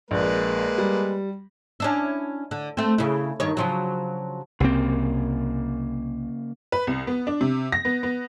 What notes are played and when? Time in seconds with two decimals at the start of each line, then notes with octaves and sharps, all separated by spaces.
0.11 A#1 G#3 A#3 B4
0.78 G3
1.80 C#4 D4 E4
2.51 D3
2.77 A3 C4
2.98 C#3 E4
3.40 G2 D#3 C#5
3.57 C#3 F3 F#3
4.60 C2 C#3 A#3 C4
6.72 B4
6.87 C2
7.07 B3
7.27 D4
7.41 C3
7.72 A#6
7.85 B3
8.03 B3